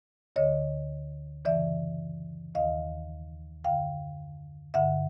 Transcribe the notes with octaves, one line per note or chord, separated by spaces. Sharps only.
D2 D3 C#5 D#5
F#2 C#3 E3 D5 E5
D#2 D#3 D#5 F5
F#2 D3 F5 G5
G2 D3 E5 F#5